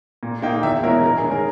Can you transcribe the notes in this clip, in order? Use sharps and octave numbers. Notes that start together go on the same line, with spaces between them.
A#2
A#3 D#4 G5
E2 E5
B2 G#3 C#4 E4 A#4
G2 A#4
G#4
D#3 G#3 C#4
A#4